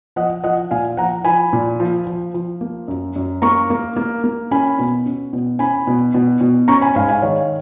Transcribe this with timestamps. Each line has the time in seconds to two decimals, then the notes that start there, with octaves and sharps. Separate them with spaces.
0.16 F3 D#5 F#5
0.44 F3 D#5 F#5
0.71 A#2 F5 G#5
0.97 F3 F#5 A#5
1.25 F3 G#5 B5
1.53 A#2
1.80 F3
2.07 F3
2.34 F3
2.61 A#3
2.88 F#2
3.16 F#2
3.42 A#3 A#5 C#6
3.70 A#3
3.96 A#3
4.24 A#3
4.51 C#4 G#5 B5
4.79 B2
5.06 C#4
5.33 B2
5.59 C#4 G#5 B5
5.87 B2
6.14 B2
6.41 B2
6.68 C#4 A#5 C#6
6.81 G#5 B5
6.95 G#2 F5 G#5
7.09 F5 G#5
7.22 D#3 C#5 F5